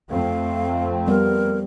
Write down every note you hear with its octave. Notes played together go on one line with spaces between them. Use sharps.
F2 A3 C4 F5
G3 B3 A#4